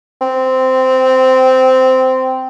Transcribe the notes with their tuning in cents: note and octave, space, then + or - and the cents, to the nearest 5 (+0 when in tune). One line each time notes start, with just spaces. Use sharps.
C4 -10